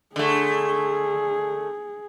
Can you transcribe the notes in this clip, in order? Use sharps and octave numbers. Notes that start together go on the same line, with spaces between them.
D3 A3 G#4